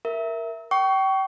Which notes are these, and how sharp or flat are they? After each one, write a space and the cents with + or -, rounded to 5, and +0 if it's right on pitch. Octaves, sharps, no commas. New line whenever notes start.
A#4 +0 E5 +0
G5 -30 C#6 +20